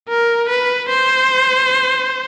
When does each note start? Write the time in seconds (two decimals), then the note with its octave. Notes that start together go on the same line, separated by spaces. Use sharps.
0.09 A#4
0.49 B4
0.89 C5